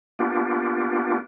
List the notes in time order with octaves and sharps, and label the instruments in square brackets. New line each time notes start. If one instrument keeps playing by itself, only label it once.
[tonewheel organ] A#3 B3 D4 F4 G4